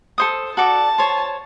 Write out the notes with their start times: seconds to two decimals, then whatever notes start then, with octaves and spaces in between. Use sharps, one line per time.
0.18 A4 C5 D#6
0.57 F#4 A4 D5 A5
0.98 C5 C#5